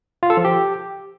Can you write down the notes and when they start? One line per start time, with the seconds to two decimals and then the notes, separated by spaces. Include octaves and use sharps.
0.23 F4
0.30 A4
0.37 F3
0.45 G4